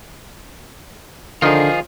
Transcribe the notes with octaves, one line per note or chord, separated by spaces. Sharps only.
D3 D#3 F3 D#4 F4 G#4